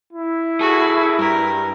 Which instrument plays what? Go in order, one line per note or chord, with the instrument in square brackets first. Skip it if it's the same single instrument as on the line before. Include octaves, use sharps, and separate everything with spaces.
[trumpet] E4
[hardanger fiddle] F#4 [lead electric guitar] G#4 A4
[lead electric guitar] G2 [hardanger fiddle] A#4